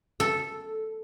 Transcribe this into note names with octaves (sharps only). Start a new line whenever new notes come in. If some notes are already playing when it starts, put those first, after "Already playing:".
A4